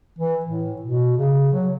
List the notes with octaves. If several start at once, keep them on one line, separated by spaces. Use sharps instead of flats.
E3
A2
B2
C#3
F#3